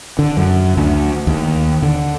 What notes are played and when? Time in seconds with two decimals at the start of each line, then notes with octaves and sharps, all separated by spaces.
0.19 D3
0.37 F#2
0.77 D2
1.27 D#2
1.82 D3